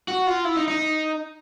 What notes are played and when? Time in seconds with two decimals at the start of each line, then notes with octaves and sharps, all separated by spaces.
0.08 F#4
0.27 F4
0.45 E4
0.56 D#4
0.68 D#4